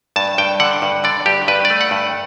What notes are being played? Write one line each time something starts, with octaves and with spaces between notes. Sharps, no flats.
G2 A5
G2 G5
D3 F#5
G2
D3 D5
G2 G4
G2 B4
D5
A3
F#5
G2